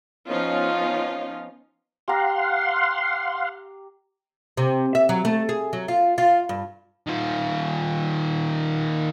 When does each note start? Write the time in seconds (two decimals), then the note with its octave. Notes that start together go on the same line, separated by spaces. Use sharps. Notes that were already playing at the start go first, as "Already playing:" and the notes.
0.29 F3 B3 C#4 D#4 F4
2.08 G4 F5 F#5 A#5 C6
4.57 C3
4.95 E5
5.09 F#3
5.25 A3
5.49 G#4
5.73 F#3
5.88 F4
6.18 F4
6.49 G2
7.07 D#3 F4